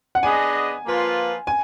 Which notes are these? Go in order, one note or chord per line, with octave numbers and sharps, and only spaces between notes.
F#5
B3 D4 G#4 D#5 G#5
F3 A#3 F4 B4
G#5